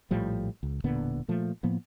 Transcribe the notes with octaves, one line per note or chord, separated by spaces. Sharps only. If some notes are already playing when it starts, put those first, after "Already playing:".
A#1 A2 F3 G3
C#2
E1 A#2 D3 B3
A#2 F3 A3
A2 F3 A#3 B3